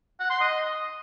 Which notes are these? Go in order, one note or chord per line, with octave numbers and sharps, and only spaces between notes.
F#5
C6
D#5